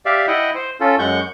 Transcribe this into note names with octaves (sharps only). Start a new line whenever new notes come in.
G4 D5 E5 F5
E4 D#5 F#5 G5
C5
C#4 F4 A4
F#2 G#3 F#5 C#6 G6